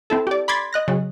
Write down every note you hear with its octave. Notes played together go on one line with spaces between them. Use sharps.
C4 E4 A4
G4 D5
B5 C6 D6 G#6 A6 B6
D#5 F#6 A#6
C#3 F#3